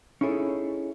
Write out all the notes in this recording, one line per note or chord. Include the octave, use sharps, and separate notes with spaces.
C#4 D#4 E4 G#4 A4 C#5